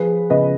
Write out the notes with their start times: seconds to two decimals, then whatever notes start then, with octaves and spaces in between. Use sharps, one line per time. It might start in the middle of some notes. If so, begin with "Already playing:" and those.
Already playing: F3 G#4 B4
0.30 C#3 B4 D#5